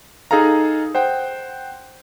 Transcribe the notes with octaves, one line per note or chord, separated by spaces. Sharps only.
D#4 G#4 A4 F5 A#5
C5 F#5 G5